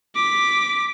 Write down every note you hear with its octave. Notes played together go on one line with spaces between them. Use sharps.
D6 B6